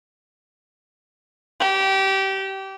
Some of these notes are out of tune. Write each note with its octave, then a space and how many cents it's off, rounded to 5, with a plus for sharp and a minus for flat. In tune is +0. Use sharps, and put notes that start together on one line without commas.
G4 -20